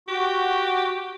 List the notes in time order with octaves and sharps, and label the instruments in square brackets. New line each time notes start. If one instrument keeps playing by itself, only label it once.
[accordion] F#4 [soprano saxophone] G4